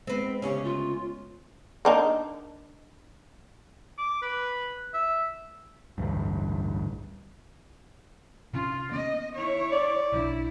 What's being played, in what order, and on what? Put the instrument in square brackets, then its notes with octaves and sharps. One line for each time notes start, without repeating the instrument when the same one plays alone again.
[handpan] G#3 B3 [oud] C4 B4
[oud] D2 C#3 C#4 [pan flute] G4 [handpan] C#5
[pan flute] F4
[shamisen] A#3 D4 D#4
[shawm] D6
B4
E5
[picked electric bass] A1 D2 G2
[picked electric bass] C3 C#4 [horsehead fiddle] F4
[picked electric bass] A#3 B3 C#4 [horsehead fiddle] D#5
[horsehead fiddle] E4 C#5
[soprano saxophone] D5
[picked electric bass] B1 F#3 D4 [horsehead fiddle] E4